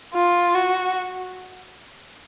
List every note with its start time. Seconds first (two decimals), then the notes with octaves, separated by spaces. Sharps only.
0.14 F4
0.54 F#4